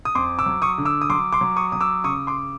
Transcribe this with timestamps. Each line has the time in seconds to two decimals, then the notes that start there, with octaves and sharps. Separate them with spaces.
0.05 D#6
0.15 F2 C6 D6
0.39 D6 E6
0.46 F#3
0.62 C#6 D#6
0.78 D3
0.85 D6 E6
1.01 D#6
1.10 F#3 C6 D6
1.33 C6 D6
1.41 F#3
1.56 C#6 D#6
1.72 F#3 D#6
1.81 D6 E6
2.04 C#3 C#6 D#6
2.27 C6 D6